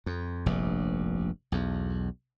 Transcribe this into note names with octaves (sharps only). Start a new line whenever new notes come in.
F2
F1 A#1 G2
B1 E2